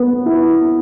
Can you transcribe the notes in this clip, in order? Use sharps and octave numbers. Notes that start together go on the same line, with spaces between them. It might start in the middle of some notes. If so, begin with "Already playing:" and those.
Already playing: B3
E4